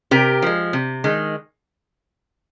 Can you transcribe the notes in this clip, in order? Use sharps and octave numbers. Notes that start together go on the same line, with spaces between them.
C3 G4 A#4
F3 G#3
C3
D#3 G#3